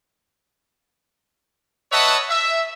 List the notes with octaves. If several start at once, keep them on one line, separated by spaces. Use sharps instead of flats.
B4 C#5 D#5 E5 F#5 A5
E5